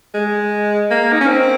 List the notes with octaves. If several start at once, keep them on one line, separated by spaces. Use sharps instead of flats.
G#3
A#3
D#4
C#4
C4